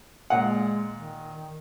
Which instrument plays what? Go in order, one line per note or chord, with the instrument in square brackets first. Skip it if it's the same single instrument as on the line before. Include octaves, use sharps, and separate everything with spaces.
[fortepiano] A#2 F#5 [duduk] G#3
[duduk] D#3